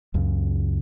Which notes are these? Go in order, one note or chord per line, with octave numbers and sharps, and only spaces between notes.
C#2 F#2 C#3